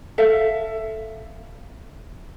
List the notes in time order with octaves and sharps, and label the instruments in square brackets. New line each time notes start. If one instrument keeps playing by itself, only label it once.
[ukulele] A4 E5 F5